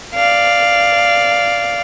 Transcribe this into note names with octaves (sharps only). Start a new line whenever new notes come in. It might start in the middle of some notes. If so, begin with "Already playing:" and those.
D5 F5